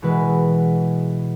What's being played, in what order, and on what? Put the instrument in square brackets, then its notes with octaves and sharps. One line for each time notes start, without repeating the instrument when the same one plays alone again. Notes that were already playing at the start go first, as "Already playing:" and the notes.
[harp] B2 E3 G#3 F#4 B4